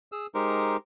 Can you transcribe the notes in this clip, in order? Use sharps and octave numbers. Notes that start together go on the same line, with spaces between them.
G#4 E6
G#3 D#4 G4 A#4 C5